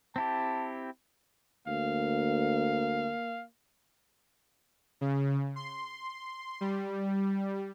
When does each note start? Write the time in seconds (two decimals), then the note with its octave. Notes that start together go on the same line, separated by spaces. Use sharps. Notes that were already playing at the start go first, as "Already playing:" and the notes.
0.16 C4 E4 G4 A5
1.68 D2 A#3 F5
5.01 C#3
5.56 C6
6.61 G3